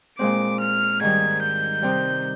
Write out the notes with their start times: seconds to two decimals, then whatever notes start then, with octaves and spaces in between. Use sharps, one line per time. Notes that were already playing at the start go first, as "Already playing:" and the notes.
0.19 A#2 G#3 C4 D6
0.60 F6
1.01 G#2 D#3 G3 G#6
1.42 G6
1.82 C3 G3 C4 D#4